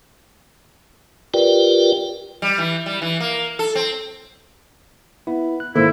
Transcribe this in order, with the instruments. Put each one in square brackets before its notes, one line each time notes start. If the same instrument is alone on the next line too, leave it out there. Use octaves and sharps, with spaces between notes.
[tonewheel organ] F4 G4 A#4 B4 D5 G5
[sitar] G3
E3
G3
E3
A#3
A4
C4
[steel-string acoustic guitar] B3 [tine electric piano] E4
[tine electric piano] F#6
[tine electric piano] G#2 D#3 [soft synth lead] A#3 [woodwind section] E4 [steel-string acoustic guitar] A4 C5 D5